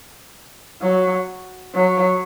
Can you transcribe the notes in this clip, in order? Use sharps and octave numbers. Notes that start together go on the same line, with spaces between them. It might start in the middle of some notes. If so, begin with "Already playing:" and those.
F#3
F#3